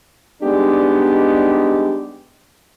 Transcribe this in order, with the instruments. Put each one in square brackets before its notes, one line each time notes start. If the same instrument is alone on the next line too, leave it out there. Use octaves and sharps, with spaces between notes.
[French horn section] G3 G#3 B3 D4 D#4 G4